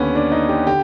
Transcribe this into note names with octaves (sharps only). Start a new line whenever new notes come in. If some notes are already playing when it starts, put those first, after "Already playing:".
Already playing: D#2 D3 B3 C#4
D4
D#4
G4
D3 G4